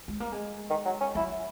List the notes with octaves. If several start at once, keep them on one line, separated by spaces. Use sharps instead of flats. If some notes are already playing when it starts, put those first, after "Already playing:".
G#3
A#3
G#3
D#3
F#3
C#4
F#3 E4